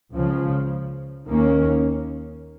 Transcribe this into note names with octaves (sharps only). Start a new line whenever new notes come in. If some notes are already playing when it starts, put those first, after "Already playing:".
C#2 C#3 F3
D#2 D#3 A#3 C#4